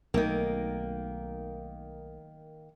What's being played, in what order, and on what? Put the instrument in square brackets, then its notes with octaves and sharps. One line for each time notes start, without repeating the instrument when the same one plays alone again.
[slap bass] B1 A3 [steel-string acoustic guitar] D#3 A#3